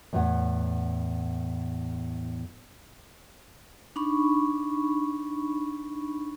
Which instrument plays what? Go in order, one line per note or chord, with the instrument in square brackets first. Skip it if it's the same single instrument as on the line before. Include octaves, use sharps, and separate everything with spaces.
[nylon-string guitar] E2 A2 B4 C#5 F#5
[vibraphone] D4 D#4 B5 C#6